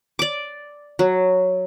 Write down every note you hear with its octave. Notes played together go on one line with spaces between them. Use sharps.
D5 D6
F#3